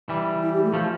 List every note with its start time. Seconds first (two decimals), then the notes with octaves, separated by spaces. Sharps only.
0.09 E3 G3
0.41 E4
0.53 G4
0.63 A3
0.73 F3 A3